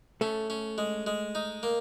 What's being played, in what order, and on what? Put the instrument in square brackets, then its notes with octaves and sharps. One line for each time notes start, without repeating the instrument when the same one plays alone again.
[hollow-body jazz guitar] A3 A4 [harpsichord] C#4
[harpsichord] C#4
G#3
G#3
D#4
A#3